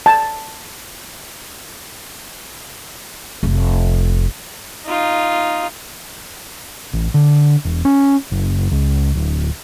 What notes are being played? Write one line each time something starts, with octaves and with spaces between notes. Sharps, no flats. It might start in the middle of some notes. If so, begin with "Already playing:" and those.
A5
F1
D#4 F4
A1
D3
E1
C#4
F#1
C#2
D1